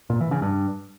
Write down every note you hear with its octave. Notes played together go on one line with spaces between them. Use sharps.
A#2
E3
C#3
G2